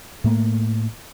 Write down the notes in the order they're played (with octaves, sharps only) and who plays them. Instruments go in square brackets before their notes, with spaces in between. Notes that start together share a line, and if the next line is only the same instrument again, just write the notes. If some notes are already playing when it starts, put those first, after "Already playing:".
[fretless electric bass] A2 A3 A#3